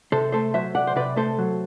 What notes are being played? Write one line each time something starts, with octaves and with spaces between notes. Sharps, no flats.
C3 A4 C5
A3 A4 C5
F#3 C5 E5
C3 D5 F#5
C5
C3 B4 D5
A3 A4 C5
F#3